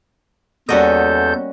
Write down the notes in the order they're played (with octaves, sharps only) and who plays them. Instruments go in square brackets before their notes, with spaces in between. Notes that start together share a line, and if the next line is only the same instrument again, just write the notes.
[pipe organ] E2 A4 G6 [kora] G3 A#3 [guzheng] C#4 F#4 D#5